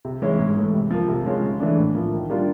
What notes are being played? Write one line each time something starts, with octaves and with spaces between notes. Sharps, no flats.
C3
E3 G#3 C#4 E4
G#2
E3 A3
C3
F3 A#3
C3
F3 G#3 C#4 F4
C#3
E3 A3 D4
A2
F3 A#3
D#3
G3 A#3 D4 F4